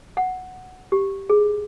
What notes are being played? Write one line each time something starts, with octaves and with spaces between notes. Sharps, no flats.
F#5
G4
G#4